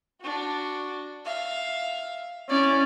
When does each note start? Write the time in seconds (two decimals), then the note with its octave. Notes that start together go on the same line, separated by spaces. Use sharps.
0.21 D4 F#4
1.25 E5 F5
2.49 C#4 E4 D5